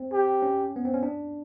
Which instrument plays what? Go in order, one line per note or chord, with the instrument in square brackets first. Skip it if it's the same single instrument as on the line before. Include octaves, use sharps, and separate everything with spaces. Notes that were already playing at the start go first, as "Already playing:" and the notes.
Already playing: [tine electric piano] C4
[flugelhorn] G4
[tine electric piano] C#4
B3
C4
C#4
D4